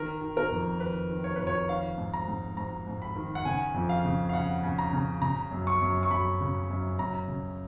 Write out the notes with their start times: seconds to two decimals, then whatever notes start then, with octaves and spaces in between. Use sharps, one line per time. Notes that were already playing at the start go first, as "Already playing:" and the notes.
Already playing: D#3 A#4
0.21 D#3
0.37 A#4
0.51 F2
0.80 D#3 B4
1.10 D#3
1.24 C#5
1.36 F2 B4
1.47 C#5
1.69 D#3 F5
1.98 G#2
2.14 A#5
2.28 G#2
2.57 G#2 A#5
2.87 G#2
3.02 B5
3.16 D#3
3.35 F#5
3.45 C#3 G#5
3.74 F2
3.89 F5
4.05 C#3
4.29 F5
4.33 C#3 F#5
4.63 C#3
4.78 A#5
4.93 C#3
5.22 C#3 A#5
5.51 F#2
5.67 C#6
5.81 F#2
6.03 C#6
6.11 F#2 B5
6.41 C#3
6.70 F#2
6.99 F#2 A#5
7.28 C#3